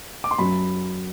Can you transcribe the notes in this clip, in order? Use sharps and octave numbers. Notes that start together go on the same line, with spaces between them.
D6
C6
F#2 F#3 B5